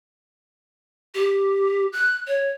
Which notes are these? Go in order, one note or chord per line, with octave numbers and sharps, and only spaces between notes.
G4
F#6
C#5